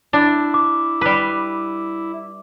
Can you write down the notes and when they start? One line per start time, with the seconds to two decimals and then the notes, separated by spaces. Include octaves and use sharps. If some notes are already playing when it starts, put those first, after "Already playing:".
0.13 D4 E4
0.54 D6
1.01 G3 B4